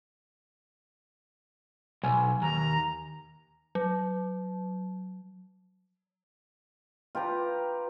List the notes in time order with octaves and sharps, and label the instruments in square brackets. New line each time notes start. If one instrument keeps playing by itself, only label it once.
[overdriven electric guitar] B1 [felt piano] G#5
[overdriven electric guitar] D#2 [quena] A#5
[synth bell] F#3
[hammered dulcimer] F4 G4 B4 A#5